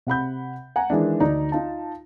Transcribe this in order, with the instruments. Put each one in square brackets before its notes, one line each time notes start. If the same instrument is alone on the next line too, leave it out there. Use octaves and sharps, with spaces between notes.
[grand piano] C3 F#5 B5 G6
F#5 G#5 A#5
D#3 E3 G#3 D4
D2 D#4 D5 A#5
D#4 F4 A5